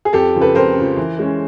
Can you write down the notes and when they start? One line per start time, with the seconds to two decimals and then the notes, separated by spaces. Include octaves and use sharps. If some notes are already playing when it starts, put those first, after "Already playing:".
0.05 G#4
0.13 F2 G4 A4
0.35 C#3 F3
0.41 A4 B4
0.55 F2 A#4 C5
0.76 C#3 F3
0.97 E3
1.19 G#3 C#4